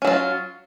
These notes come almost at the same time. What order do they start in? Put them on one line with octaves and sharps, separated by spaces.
C#4 F#3 F4